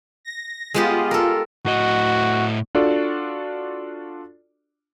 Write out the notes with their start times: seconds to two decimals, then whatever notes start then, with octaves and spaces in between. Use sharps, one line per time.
0.25 A#6
0.74 G#3 B3 F4 G4
1.11 A4 A#4
1.66 A2 F#4 D#5
2.75 D4 F4 F#4 A4 D5